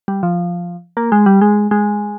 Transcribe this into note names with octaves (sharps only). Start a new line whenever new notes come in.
G3
F3
A#3
G#3
G3
G#3
G#3